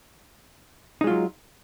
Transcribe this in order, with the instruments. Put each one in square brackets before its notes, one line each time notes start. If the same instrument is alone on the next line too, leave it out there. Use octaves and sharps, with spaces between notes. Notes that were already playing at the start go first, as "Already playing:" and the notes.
[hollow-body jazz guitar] D#4
G#3
F4
F#3